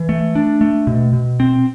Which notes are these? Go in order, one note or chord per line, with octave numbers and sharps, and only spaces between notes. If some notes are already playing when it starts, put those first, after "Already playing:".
Already playing: E3
A3
D4
A3
B2
B2
C4